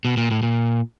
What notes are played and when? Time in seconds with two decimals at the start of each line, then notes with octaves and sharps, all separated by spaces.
0.05 B2
0.17 A#2
0.31 A2
0.43 A#2